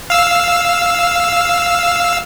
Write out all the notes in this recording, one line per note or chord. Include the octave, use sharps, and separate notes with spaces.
F5 E6